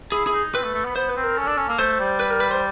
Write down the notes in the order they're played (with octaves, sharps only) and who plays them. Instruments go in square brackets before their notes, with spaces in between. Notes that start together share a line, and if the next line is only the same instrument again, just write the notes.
[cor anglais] E4 [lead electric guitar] G#4
[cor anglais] E4 [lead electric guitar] G#4
[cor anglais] D#4
[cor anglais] C4 [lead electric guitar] B4
[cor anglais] A3
A3
B3
[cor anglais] B3 [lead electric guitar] C5
[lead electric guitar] B4
[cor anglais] C4
[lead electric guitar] A#4
[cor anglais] C#4 [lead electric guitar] A4
[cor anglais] D4
C#4
A#3
[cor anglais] A3 [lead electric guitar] C5
[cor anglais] G3
[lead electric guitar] B4
A#4
B4
C5